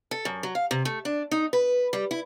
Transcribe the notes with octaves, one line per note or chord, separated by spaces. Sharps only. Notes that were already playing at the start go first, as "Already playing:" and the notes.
A4
F#2
F#3
F5
C3
A3
D4
D#4
B4
G3
E4